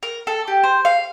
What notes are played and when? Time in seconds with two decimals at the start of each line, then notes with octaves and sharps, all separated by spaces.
0.03 A#4
0.27 A4
0.48 G4
0.63 C5
0.85 F5